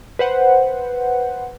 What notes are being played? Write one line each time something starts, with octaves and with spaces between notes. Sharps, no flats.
B4 C5 F#5